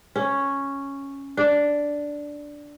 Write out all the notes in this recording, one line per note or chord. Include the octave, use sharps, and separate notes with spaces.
C#4
D4